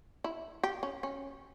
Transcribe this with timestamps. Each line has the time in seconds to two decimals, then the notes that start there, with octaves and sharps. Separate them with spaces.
0.24 E4
0.64 G4
0.83 C#4
1.03 C#4